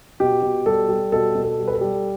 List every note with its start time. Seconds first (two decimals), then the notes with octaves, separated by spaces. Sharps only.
0.20 B2 G4
0.43 B2
0.66 G3 A4
0.89 G3
1.12 B2 A4
1.35 B2
1.43 A4
1.59 G3
1.68 B4
1.73 A4
1.81 G3